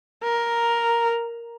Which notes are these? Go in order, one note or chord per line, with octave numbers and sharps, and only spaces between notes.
A#4